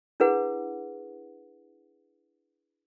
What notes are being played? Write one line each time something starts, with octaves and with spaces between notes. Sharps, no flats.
D4 E4 G#4 B4 F#5